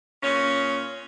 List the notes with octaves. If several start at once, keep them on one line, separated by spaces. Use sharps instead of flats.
A#2 C#4